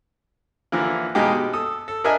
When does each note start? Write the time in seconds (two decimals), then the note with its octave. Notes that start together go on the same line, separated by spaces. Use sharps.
0.72 D3 E3 F3 A#3
1.15 B2 G#3 A#3 D#4 G4
1.32 B2
1.53 A4 D#6
1.88 A4
2.04 D4 A#4 D#5 E5 G#5